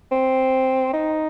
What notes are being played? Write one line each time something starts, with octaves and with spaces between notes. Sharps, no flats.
C4
D#4